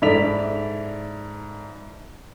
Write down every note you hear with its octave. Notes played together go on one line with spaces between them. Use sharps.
G#2 E4 A4 D5 B6 F7